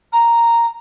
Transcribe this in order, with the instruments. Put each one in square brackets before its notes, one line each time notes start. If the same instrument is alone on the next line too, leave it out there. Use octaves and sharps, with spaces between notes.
[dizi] A#5